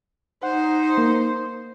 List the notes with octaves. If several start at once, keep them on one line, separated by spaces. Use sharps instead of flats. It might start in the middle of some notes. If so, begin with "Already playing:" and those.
D#4 C5 F#5
A#3